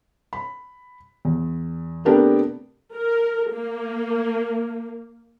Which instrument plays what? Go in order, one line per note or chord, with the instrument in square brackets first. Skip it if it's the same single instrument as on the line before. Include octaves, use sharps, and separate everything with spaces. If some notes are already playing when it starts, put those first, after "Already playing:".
[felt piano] B5
E2
C3 A3 B3 D4 G4 A#4
[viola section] A#4
A#3